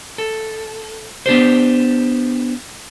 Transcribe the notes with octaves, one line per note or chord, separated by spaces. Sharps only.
A4
B3 D4 G4 C5